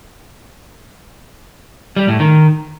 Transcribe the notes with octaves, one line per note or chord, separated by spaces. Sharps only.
G3
A2
D#3